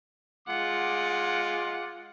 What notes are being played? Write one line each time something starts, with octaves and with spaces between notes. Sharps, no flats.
G#3 F4 F#5 D6